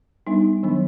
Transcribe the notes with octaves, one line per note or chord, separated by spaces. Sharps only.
G3 B3 D4 D#4
D#3 F#3 B3 D4